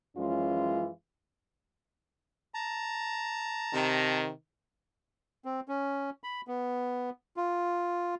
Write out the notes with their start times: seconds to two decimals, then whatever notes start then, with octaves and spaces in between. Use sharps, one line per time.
0.17 F#2 E3 F3 G#3 C#4 F4
2.54 A5 A#5
3.74 C3 D#3
5.45 C4
5.68 C#4
6.24 B5
6.47 B3
7.37 F4